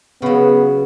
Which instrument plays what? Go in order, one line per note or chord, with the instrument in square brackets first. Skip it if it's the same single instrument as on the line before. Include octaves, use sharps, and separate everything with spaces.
[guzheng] C#3 F#3 [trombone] B3